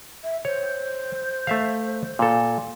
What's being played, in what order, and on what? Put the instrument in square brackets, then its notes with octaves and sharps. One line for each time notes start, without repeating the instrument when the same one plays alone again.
[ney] E5
[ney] C5 [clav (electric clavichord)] C#5
[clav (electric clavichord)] A3 E5 F5
A#2 A4